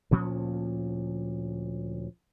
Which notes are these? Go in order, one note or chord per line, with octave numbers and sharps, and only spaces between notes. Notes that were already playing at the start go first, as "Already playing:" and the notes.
D2 A#2 F3 C#4